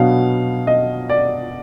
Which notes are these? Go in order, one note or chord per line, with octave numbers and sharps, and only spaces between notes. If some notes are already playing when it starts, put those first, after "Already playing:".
Already playing: B2 F#3 B3 D4 F5
D#5
D5